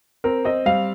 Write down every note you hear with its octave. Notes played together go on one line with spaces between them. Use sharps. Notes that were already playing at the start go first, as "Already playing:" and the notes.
C4 A#4
C4 D#5
G3 F5